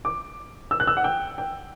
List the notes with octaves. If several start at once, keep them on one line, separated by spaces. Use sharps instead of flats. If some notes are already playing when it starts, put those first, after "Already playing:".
D6
E6
F#6
E6
F#5
G5
G5